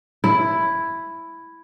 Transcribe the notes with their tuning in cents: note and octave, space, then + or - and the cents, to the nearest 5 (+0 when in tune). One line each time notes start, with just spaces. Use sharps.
E4 +5